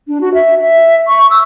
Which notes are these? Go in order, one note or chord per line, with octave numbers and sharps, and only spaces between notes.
D4
F#4
E5
E5
C#6
E6